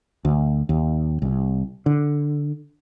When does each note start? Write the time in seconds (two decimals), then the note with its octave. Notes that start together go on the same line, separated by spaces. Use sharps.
0.25 D2
0.69 D#2
1.22 C2
1.86 D3